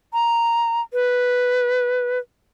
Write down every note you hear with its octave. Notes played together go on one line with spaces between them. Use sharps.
A#5
B4